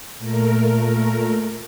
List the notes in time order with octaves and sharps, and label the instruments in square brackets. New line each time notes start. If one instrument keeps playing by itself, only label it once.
[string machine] A#2 A3 A#4